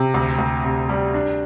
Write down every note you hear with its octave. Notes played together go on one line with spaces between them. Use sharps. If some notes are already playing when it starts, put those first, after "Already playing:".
Already playing: C3
D2
D2
C3
G3
D4